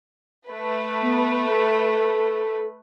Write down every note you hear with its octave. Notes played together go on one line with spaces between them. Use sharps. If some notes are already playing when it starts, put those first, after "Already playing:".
A3 B4
B3
A4